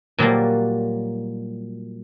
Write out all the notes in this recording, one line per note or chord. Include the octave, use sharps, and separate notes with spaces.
A#2 F#3 G3 A#3